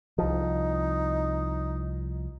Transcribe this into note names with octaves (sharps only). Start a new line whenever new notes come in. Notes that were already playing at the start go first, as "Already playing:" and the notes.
C2 F3 D#4